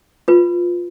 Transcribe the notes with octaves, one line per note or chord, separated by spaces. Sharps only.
F4 B4